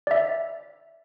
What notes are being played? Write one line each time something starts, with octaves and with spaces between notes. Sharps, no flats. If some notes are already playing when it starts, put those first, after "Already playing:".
D5 E5